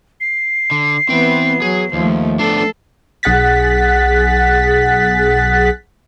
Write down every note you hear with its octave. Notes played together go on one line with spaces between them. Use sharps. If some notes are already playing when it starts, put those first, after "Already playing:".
C7
D3
E3 B3 C4 G5
F#3 G#4
D#2 F3 A3
B3 D4 A4 C7
B1 G#4 F#5 F#6 A6 B6